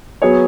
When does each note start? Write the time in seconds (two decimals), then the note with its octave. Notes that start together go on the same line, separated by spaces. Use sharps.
0.22 F#3 B3 G#4 C#5